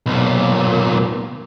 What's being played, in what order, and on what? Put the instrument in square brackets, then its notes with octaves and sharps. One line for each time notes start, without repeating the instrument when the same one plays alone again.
[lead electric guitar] B1 A#2